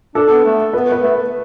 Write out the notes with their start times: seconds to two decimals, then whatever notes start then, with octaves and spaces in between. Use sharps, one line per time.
0.15 D4 A4
0.30 B3
0.44 A3
0.73 B3 B4
0.92 B4
1.02 A3